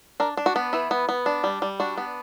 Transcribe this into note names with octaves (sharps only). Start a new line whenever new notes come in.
D4 A#4
D4
F#4
B3
E3 E4
B3
B3
D4
G3
G3
D4 F#4
B3